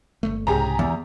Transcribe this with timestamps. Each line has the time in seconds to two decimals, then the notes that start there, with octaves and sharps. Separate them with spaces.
0.23 G1 E2 A3
0.47 C2 G#2 C#3 G4 G#4 A#5
0.79 E2